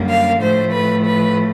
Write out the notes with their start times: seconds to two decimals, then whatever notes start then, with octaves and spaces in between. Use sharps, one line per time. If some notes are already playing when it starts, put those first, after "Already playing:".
Already playing: F#2 D3 G3 A#3
0.09 F5
0.41 A2 F3 A3 C5
0.73 B4
1.05 B4